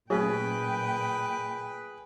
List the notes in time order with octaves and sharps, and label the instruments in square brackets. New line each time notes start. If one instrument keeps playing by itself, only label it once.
[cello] A#2 G5 [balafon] F#3 A3 C#4 [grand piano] G#4 [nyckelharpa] B4